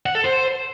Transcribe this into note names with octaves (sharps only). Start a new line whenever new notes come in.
F#5
A4
C5